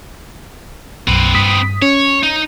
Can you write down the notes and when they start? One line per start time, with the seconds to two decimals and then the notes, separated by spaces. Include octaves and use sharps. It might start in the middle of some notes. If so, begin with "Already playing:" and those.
1.08 B1 F#2 C4 B4
1.35 G2 D#6 B6
1.82 C#4 C#5
2.23 D#4